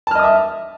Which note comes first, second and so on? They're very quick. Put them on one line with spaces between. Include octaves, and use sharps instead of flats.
A5 F6 D#5 D#6 E5